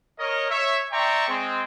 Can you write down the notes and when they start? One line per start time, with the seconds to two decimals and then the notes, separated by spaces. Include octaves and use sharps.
0.19 A#4 C#5 D#5
0.50 C#5 E5
0.92 D5 E5 G5 A#5 C6 C#6
1.28 G#3 C4